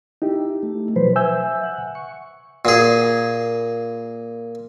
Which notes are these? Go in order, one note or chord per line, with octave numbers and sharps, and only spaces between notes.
D#4 E4 G4
A3
B2 F3 F#3 B4 C5
E5 G#5 E6 G6
F#5
C#6
A#2 G#4